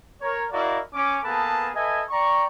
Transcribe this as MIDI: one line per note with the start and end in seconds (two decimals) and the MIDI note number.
0.21 0.44 70
0.21 0.44 73
0.51 0.78 64
0.51 0.78 66
0.51 0.78 70
0.51 0.78 74
0.51 0.78 75
0.51 0.78 77
0.93 1.18 61
0.93 1.18 86
1.23 1.68 58
1.23 1.68 59
1.23 1.68 68
1.23 1.68 69
1.23 1.68 71
1.23 1.68 81
1.75 2.03 69
1.75 2.03 71
1.75 2.03 75
1.75 2.03 76
1.75 2.03 80
2.10 2.45 74
2.10 2.45 79
2.10 2.45 82
2.10 2.45 85